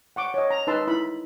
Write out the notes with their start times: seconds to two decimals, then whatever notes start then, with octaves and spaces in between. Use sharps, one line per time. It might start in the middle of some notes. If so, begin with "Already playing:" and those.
0.16 F#5 C#6 D6
0.34 C#5 D#5
0.51 A#5
0.67 D#4 B4 A5 C6 E6
0.87 E4 B5